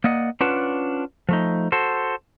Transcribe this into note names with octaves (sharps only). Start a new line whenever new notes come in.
A#3 D5 D#5 F#5
C#4 D4 F4 B4 F#5 A5
F3 A3 D#4
F#4 A4 C5